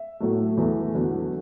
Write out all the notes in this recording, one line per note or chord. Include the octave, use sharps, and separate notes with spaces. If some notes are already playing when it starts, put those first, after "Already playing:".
Already playing: E5
A2 F#3 A3
E2 E3 A3
E2 D3 F#3